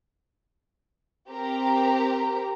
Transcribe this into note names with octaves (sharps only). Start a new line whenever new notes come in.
C4 G4 A#4 A#5